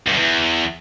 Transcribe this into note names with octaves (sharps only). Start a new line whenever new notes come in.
G2
F#2
E2